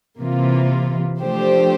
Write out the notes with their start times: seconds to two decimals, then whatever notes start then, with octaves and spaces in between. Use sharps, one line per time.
0.20 C3 E3 A#3 F4
1.21 F3 A3 D4 G4 C5